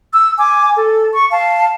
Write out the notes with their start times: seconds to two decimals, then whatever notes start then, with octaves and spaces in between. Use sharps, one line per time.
0.12 E6
0.38 G#5 D6
0.76 A4
1.13 C#6
1.31 F5 A5